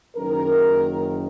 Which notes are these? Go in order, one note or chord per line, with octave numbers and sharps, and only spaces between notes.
F#1 F#2 D#3 A#4